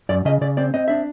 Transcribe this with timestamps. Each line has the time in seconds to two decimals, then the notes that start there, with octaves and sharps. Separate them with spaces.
0.09 F#2 D5
0.25 C#3 D#5
0.41 C#3 D5
0.57 C4 D5
0.74 C4 D#5
0.88 D4 E5